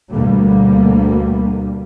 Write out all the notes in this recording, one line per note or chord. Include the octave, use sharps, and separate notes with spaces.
D2 B2 D3 G3 A#3